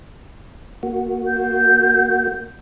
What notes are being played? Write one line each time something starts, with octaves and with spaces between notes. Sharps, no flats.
A#3 F#4
G6